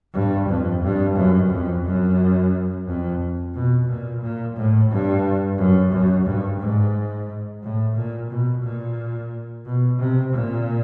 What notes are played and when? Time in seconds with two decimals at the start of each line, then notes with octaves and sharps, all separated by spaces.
0.14 G2
0.49 F2
0.83 G2
1.17 F#2
1.51 F2
1.85 F#2
2.87 F2
3.54 B2
3.89 A#2
4.22 A#2
4.57 A2
4.91 G2
5.58 F#2
5.92 F#2
6.26 G2
6.61 G#2
7.63 A2
7.95 A#2
8.31 B2
8.64 A#2
9.66 B2
10.00 C3
10.33 A#2